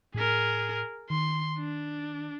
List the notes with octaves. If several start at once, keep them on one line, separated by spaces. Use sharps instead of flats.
A2 G#4 A#4 B6
D#3 C6
D4